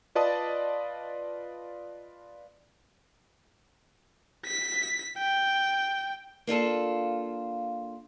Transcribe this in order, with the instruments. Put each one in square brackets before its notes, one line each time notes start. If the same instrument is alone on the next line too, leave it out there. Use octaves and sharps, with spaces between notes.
[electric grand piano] F4 B4 D5 D#5 A5 D#6
[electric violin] B6
G5
[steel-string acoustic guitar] A#3 D4 F4 A4